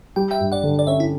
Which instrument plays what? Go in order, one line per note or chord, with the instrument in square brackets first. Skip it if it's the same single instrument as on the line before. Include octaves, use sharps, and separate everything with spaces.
[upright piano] G3 [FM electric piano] G5
[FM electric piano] E5 G5
[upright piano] G2
[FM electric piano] D5 F#5
[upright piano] D3
[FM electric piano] D5
[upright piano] C#4 [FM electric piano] C#5 E5
[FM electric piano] E4